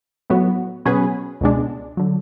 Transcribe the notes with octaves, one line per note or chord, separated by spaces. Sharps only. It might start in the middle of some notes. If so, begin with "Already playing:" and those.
A2 F#3 B3 F#4
B2 F#3 C#4 G#4 B4
C#2 B2 G#3 D4
D3 F#3